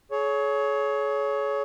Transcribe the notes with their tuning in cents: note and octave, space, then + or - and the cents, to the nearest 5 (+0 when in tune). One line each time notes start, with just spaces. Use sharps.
G#4 +40 C#5 +15